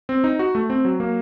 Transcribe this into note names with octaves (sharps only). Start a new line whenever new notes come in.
C4
D#4
F#4
A3
C4
F#3
A#3